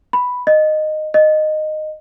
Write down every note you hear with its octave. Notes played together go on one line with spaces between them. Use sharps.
B5
D#5
D#5